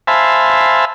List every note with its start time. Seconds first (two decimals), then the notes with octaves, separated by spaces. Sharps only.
0.07 C5 E5 F5 G#5 A5 B5